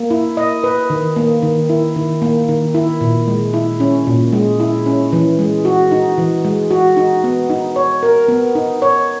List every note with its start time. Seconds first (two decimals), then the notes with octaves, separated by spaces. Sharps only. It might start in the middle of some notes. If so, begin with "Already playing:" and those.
Already playing: A#3
0.10 E4
0.37 D#5
0.64 B4
0.90 D#3
1.16 A#3
1.42 D#3
1.69 E4
1.96 D#3
2.22 A#3
2.48 D#3
2.75 E4
3.01 A#2
3.28 G#3
3.54 E4
3.80 C#4
4.07 A#2
4.32 G#3
4.60 E4
4.86 C#4
5.13 E3
5.39 G#3
5.65 F#4
5.91 D#4
6.18 E3
6.45 G#3
6.71 F#4
6.97 D#4
7.24 B3
7.50 D#4
7.76 C#5
8.03 A#4
8.29 B3
8.55 D#4
8.82 C#5